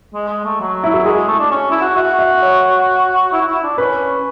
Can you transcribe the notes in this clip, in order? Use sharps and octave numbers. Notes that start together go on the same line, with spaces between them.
G#3
G#3
A3
F#3
E4
F#4
G#3 G#4
A3
D4
C#4
E4
F#4
F#4 E5
E5
C#5
E4
F#4
E4
D4
C#4 B4